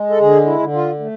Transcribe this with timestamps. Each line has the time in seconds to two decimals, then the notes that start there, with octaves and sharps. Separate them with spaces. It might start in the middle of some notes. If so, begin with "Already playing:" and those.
Already playing: G#3
0.10 A4
0.19 D3 G#4
0.46 E4
0.59 D3
0.73 F4
1.00 A3